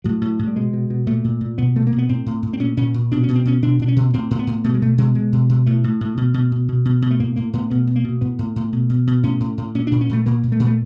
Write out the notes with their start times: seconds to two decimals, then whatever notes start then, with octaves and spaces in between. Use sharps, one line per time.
0.04 A2 F#3
0.21 A2
0.39 A2
0.47 G3
0.56 B2 G#3
0.73 B2
0.90 B2
1.07 A#2 A3
1.24 A#2
1.41 A#2
1.58 B2 B3
1.75 B2 A3
1.87 A#3
1.92 B2
1.98 B3
2.09 A2 C4
2.26 A2
2.43 A2
2.53 C4
2.60 A#2 C#4
2.77 A#2 C#4
2.94 A#2
3.11 B2 D4
3.23 C#4
3.28 B2
3.35 C4
3.45 B2 C#4
3.62 B2 D4
3.79 B2 D4
3.88 C#4
3.96 B2
4.14 A2 C4
4.31 A2
4.39 B3
4.47 A2
4.64 B2 A3
4.74 G#3
4.82 B2 A3
4.98 B2 G#3
5.15 B2 G#3
5.32 B2
5.49 B2
5.66 A2 A3
5.84 A2
6.01 A2
6.17 B2
6.34 B2
6.52 B2
6.68 B2
6.85 B2
7.02 B2
7.11 A3
7.20 A2 A#3
7.36 A2 A#3
7.53 A2 B3
7.70 B2 B3
7.87 B2
7.96 A#3
8.04 B2
8.21 A2 B3
8.39 A2
8.56 A2
8.72 B2
8.90 B2
9.07 B2
9.23 A2 C#4
9.40 A2
9.58 A2
9.75 A#2 C#4
9.87 A#2 D4
10.01 C#4
10.09 A#2 A3
10.26 A#2 A#3
10.43 A#2
10.52 A3
10.60 A#2
10.67 A3